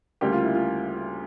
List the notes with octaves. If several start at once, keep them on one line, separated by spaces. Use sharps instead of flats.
D2 C#3 G3 A#3 G4
F4
E4
F4